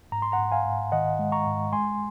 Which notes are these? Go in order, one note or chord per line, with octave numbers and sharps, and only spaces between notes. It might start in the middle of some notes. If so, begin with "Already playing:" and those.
G#2 A#5
C6
F#5 A#5
G#2
F5 G#5
G#2
D#3 D#5 F#5
G#3
A#5 C#6
G#2
G#3 G#5 C6